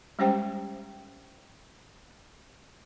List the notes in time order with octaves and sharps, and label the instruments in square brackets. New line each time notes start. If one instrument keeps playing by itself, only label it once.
[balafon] G3 G#3 C#4 G4 C5 G5